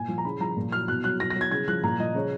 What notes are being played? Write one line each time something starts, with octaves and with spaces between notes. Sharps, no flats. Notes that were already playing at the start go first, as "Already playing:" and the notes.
Already playing: A#2 G#5
F3
A#5
C#3 B5
F3 A#5
A#2
F#3 F6
B2 F#6
F#3 F#6
B2 A#6
F#3 A#6
G#6
C#3 G#6
F3 F#6
A#2 A#5
F3 D#5
C#3 C#5